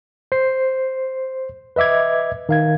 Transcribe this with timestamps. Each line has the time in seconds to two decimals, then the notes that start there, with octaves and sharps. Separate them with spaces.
0.32 C5 C7
1.76 B4 D#5 E5 D6 G#6
2.49 D#3 F5 G#6